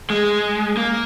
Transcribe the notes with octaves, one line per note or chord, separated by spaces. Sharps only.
G#3
A#3